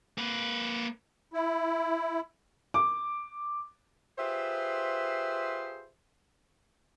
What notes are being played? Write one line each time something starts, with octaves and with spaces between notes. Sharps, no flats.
A#3 B4
E4
D6
F4 G4 G#4 B4 C5 E5